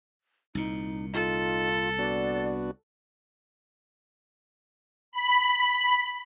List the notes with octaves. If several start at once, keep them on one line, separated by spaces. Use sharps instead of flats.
C2 A#2 D#4
D#4 F4 A4
B3 D4 F#4 D5
B5